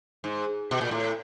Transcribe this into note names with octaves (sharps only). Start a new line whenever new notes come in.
G#2
B2
A#2
A2